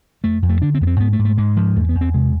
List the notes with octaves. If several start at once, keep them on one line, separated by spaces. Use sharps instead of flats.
F2 A3
F2
A3
D3 D4
C4
F2 B3
C4
G#2 B3
A3
G#2
A3
G#2 G#3
G#2 F3
E2 A3
B3
E2
C4
C3 G#3